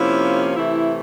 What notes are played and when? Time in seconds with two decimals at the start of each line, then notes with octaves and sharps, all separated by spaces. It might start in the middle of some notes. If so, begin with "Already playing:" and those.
Already playing: C3 F3 A#3 C#4 E4
0.56 C3 E3 A3 E4